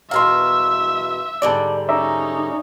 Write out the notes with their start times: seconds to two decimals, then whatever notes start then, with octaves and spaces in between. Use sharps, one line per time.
0.11 E2 B2 A#4 E5 F5 C6
1.42 G#2 D3 G3 D5 A5
1.89 C#4 D#4 D5 E5 A#5